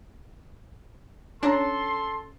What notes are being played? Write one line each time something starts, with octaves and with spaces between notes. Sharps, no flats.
C#4 D4 A4 C#5 A#5 C6